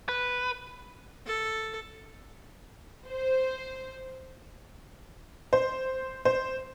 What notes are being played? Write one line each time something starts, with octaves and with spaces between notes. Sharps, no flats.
B4
A4
C5
C5
C5